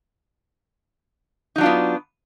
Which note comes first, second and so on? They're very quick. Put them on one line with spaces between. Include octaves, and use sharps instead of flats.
D#4 F#3 D4 F4 B3